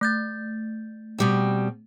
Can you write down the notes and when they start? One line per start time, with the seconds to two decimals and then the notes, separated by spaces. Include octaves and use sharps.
0.01 A3 G6 A6
1.18 B2 G3 C4